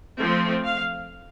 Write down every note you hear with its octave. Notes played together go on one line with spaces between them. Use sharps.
F3 A3 C4
F5